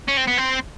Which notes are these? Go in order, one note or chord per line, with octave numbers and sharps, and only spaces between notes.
C#4
C4
B3
C4